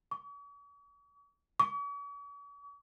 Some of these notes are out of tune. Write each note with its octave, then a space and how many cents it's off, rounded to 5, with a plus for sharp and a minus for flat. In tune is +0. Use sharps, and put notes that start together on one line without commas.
C#6 +45
C#6 +45